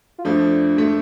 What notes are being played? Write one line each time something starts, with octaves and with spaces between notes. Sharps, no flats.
F4
F2 F3 A3 D4
F2 F3 A3